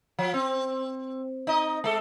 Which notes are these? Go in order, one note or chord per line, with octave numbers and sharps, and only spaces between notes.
F3
C4
D#4 D#5
G#3 A4